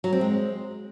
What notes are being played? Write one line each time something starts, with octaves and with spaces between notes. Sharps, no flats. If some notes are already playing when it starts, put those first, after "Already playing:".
F#3
C4
G#3